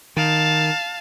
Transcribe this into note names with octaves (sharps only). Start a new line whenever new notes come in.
D#3 F5 A5